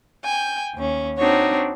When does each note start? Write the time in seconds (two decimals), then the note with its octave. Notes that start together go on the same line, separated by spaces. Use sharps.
0.25 G5 G#5 G6
0.74 D#2 C#4
1.17 C4 D4 D#4 F#4 C#5